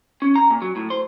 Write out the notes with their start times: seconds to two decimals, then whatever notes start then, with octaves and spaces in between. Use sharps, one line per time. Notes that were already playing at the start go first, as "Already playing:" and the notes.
0.22 C#4
0.36 A#5
0.50 A#2
0.62 F#3
0.76 A2
0.90 C5